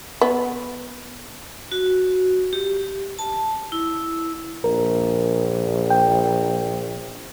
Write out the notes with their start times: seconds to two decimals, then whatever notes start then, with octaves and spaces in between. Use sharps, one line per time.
0.21 B3
1.72 F#4
2.53 G4
3.19 A5
3.72 E4
4.64 A#1 A#4
5.90 G5